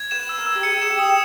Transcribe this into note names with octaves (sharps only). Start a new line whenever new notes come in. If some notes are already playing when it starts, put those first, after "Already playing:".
Already playing: G#6
B4 E7
E6
A#4
E6
G4
G#4 C#7
G#4 E7
G4
D#6